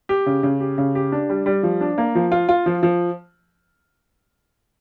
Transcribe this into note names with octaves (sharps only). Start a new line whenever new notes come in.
G4
C#3
C#3
G4
C#3
G4
D4
G3
G3
F3
D4
A#3
F3
F4
F4
F3
F3